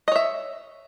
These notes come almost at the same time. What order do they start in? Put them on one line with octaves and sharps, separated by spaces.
D#5 C#5 E5